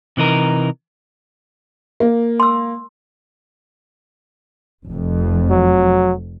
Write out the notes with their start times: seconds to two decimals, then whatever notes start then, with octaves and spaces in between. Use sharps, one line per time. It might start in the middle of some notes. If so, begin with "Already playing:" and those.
0.17 C3 E3 D#4 A#4
2.00 A#3
2.40 C6 E6
4.88 F1 F2
5.50 F#3